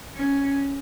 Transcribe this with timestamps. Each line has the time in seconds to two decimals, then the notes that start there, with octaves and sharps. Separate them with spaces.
0.15 C#4